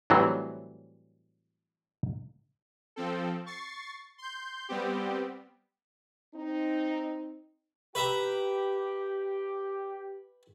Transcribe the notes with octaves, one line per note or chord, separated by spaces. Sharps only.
A2 E3 F#3 G3 C4
F3 C4 A4
C#6 A6 C7
C6 G6
G3 B3 C4 G4
C4 D#4
G4 B4 E5 A#5